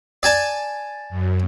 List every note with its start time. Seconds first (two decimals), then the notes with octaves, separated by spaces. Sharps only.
0.23 D5 G#5 A5
1.09 F#2